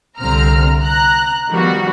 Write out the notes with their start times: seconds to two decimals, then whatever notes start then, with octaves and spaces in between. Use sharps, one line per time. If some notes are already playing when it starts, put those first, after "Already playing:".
0.19 C2 D3 C4 A#5 F6
0.81 A#5 F#6
1.49 D#3 F3 G3 B3 F#4